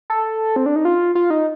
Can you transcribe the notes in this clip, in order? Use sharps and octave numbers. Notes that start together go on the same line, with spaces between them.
A4
C4
D4
D#4
F4
F4
D#4